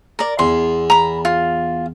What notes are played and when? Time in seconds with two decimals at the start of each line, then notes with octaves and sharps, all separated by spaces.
0.19 A#4 D5
0.39 E2 C6
0.90 A#5 B5
1.25 F4